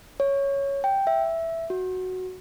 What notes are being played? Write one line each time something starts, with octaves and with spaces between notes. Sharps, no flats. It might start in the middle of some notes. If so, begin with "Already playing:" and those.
C#5
G5
E5
F#4